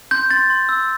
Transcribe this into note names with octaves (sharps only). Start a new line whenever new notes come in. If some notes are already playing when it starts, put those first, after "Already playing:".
C6 G6
C6 A6
C6
E6